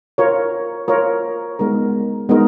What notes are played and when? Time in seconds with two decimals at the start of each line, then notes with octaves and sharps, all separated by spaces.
0.18 F4 A#4 C#5
0.88 F4 A#4 C#5
1.59 G#3 B3 D#4 A#4
2.29 G#3 B3 D#4 A#4